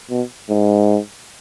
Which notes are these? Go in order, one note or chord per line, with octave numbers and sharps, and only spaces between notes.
B2
G#2